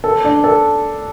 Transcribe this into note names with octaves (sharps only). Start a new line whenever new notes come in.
A4
D4
A4